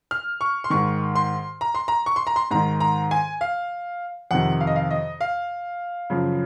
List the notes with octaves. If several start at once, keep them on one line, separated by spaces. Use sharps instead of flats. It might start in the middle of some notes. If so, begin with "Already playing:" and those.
F6
C#6
C6
G#2 D#3 C#6
C6
A#5
C6
A#5
C#6
C6
A#5
C6
G#2 D#3 A#5
A#5
G#5
F5
F2 C3 D#3 F#5
F5
D#5
F5
D#5
F5
F#2 C#3 F3